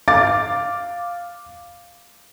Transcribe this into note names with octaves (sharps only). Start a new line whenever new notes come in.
F5 D6 A6